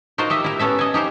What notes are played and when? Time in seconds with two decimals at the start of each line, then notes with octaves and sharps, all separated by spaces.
0.18 D#4 F4 F#4 A#4 C5 D#5
0.30 G4 D#5 E5
0.44 E4 A#4
0.59 B3 C#4 A4 E5
0.79 D#5 G#5
0.94 D#4 G4 A#4 C5